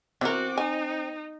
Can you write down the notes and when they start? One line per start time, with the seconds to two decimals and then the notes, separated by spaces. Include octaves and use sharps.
0.21 E3 C4 F#4 A#4 D6
0.58 D#4 G#5